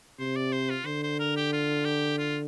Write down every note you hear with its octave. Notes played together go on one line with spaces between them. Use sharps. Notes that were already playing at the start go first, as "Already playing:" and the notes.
C3 C5
D5
C5
F4
D3 C5
C5
A#4
G4
F4
G4
F4